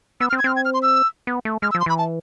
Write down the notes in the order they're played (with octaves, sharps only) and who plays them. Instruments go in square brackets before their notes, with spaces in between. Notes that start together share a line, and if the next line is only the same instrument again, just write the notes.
[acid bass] B3 [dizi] E6
[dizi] F6
[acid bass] C4
[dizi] G#6
[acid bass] C4 [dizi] F6
[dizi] G#6
F6
C6
E6
[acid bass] B3
A3
[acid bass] G#3 [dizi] F6
[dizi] E6
[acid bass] F3
[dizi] C6
[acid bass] E3 [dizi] B5
[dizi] A5